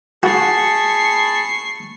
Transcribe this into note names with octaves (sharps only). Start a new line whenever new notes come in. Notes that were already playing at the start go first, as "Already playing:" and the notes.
F#4 G#4 A5 B5 C#6 C7